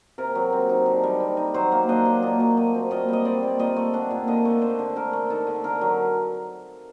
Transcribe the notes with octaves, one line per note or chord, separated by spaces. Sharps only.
C3 A#4
F#3
C4
D#4
D3
G3
C4
D#4
F#3 C5
A#3
D4 D#5
F#3
A#2 D#5
F#3
A3 D#5
C4
A#2 D#5
G3 D#5
C4 D5
A#2
A#2 D#5
A3
D4 F#5
A#2
D3 D#5
A3
D4 C5
D3
D3 A#4
A3
D#4 A4
D3
D3 A#4
F#3